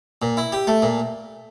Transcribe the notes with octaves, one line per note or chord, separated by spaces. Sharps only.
A#2
E4
G4
A3
A#2